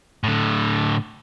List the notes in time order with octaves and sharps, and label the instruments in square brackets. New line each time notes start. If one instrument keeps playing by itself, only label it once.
[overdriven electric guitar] A2 D3